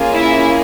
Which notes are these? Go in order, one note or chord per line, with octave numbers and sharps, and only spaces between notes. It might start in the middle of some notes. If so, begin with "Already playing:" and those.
Already playing: A#3 C#4 F4 G#4
E4 E5